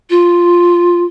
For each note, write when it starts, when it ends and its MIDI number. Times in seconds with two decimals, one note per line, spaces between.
0.10 1.04 65